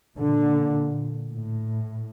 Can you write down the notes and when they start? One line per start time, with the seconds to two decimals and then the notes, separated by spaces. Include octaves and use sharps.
0.18 A#2 D3
1.30 A2